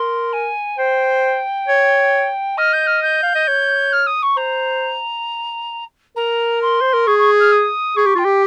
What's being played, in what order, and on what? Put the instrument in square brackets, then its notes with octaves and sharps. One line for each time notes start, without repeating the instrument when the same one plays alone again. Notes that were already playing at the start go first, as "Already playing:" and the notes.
Already playing: [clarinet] A#4 [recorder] C6
[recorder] G#5
[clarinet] C5 [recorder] G5
[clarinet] C#5
[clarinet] D#5 [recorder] F6
[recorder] G6
F6
G6
[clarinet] F5
D#5
C#5
[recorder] F6
D#6
C#6
[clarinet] C5 [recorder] A#5
[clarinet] A#4 [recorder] A#5
[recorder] C6
[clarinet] C5
A#4
[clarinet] G#4 [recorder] C#6
[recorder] C#6
F6
D#6
[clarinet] G#4 [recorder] C#6
[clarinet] G4
[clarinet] F4 [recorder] G5
[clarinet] G4